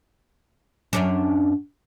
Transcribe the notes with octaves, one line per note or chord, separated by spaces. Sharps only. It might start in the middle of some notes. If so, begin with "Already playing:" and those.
F#2 C#4 D4